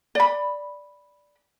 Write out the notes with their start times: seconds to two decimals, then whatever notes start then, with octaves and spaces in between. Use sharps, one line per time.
0.15 D5 B5